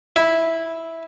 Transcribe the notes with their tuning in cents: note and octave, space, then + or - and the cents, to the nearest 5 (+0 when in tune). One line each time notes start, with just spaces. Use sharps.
E4 -5